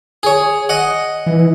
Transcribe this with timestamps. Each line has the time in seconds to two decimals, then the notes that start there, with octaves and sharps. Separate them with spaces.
0.23 G#4 C#5
0.69 D#5 F#5
1.26 E3